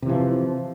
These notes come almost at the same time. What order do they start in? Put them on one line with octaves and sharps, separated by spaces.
C3 E3 F3